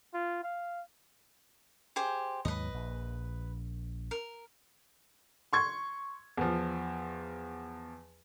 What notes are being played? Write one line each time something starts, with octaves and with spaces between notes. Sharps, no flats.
F4
F5
G4 G#4 C5
D#2 G#2 F#3 B4 D#5
A#1
A#4
C6 C#6 G#6
E2 F3